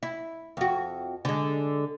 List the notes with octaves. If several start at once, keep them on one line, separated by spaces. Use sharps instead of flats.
E4
F2 F#4
D3 G#3